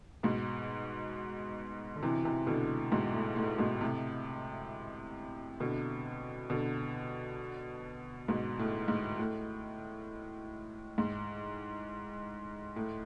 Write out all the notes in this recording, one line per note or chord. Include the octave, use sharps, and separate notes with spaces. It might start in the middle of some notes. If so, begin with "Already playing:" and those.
G#2 B2
D3
C3 E3
C3 E3
B2 D3
G#2 B2
A2
A2
G#2 B2
A2 C3
B2 D3
B2 D3
G#2 B2
A2
G#2
A2
G#2
A2